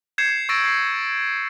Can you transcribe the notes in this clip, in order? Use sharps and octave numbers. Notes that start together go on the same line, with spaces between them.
G6 G#6 C7 C#7 E7
C#6 E6 A6 A#6 D7 E7
C7